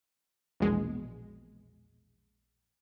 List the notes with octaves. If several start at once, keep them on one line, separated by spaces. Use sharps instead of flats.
A#1 E2 B2 G#3